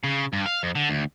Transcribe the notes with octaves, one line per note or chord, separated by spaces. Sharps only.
C#3
G2
F5
F2
D3
D2